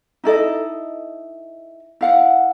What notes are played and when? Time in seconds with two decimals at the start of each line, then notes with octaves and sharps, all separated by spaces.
0.24 D#4 E4 A4 D#5
2.01 E4 F5 F#5